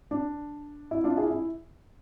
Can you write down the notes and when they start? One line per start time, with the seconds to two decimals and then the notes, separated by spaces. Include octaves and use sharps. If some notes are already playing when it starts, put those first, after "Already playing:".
0.11 D4
0.91 E4
1.04 D4 F4
1.17 E4 G#4
1.30 E4